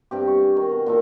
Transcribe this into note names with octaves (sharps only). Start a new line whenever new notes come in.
G2 C3 G4
C#6
G#4
D#3
B2
A#2 D#3 A4